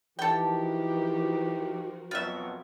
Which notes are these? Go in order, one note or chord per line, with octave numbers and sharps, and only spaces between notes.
E3 F3 D#4 F#4 G4 A4 A#4 G5
F2 B2 F#3 F4 E5